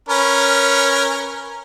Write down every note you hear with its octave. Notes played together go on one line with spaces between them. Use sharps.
C#4 A#4 B4